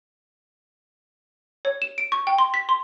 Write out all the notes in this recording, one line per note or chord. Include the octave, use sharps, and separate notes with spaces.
C#5
E7
D7
C#6
G5
C6
B6
C6